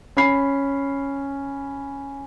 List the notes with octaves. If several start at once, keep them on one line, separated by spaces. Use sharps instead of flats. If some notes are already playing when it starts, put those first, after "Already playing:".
C#4 B5 C7